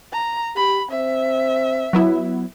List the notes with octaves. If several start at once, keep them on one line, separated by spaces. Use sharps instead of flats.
A#5
G4 B5
C4 E5
F#3 B3 E4